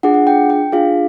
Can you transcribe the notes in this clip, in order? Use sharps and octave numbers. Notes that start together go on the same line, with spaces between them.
D4 F4 G#4 F#5
F#5
G5
G5
D4 F4 G#4 F5